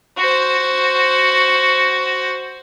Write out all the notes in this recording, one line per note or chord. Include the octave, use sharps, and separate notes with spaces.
F#4 C5